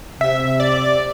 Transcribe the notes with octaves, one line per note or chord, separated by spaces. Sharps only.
C3 E5
D5